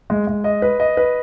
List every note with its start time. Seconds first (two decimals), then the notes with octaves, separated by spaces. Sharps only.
0.10 G#3
0.27 G#3
0.44 D#5
0.62 B4
0.80 D#5
0.97 B4